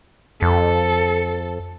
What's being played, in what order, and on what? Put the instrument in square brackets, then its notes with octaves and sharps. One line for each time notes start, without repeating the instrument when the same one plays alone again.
[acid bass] F2 [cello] A4